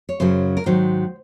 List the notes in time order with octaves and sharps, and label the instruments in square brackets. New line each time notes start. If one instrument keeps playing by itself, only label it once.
[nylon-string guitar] C#5
F#2 C#3 F#3 C5
A#4
G#2 D#3 F#3 C5